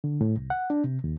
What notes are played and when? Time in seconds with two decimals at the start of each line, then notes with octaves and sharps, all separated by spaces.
0.04 D3
0.21 A2
0.37 C2
0.50 F#5
0.70 D4
0.84 C3
1.04 D#2